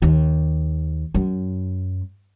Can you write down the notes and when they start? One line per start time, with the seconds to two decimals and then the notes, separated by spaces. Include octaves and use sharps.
0.02 D#2
1.14 F#2